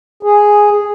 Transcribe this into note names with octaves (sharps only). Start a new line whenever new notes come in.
G#4